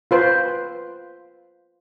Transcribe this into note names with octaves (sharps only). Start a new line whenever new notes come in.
F4 B4 C5